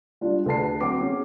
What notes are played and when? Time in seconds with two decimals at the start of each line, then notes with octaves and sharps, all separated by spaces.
0.21 G3 D4 F4
0.46 D2 B4 A5 C7
0.80 F#3 C4 D6 C7
1.00 B3 C#4 G#4